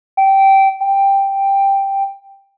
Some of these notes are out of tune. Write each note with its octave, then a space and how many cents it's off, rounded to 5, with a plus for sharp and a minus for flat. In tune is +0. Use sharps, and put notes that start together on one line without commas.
G5 -15
G5 +5